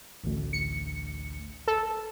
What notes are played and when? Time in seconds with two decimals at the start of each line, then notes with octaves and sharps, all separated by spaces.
0.24 A1 D2
0.53 C#7
1.68 A4